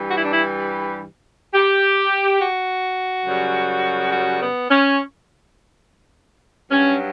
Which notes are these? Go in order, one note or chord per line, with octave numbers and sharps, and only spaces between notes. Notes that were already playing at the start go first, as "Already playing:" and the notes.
Already playing: G2 E3 G3
F#4
E4
D4
E4
G4
F#4
F#2 C#3 G3
F#4
B3
C#4
G2 F#3 C#4